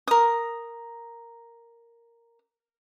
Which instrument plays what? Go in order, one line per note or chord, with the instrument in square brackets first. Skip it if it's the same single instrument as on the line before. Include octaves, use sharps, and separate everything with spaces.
[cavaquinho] A#4 D#6